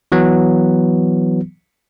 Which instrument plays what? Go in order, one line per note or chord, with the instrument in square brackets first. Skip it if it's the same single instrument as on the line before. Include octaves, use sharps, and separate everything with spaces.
[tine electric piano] E3 F#3 B3